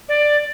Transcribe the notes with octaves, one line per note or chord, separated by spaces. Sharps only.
D5